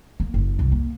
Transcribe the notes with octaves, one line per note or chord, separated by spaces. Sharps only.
A#3
F#1
C2
A#3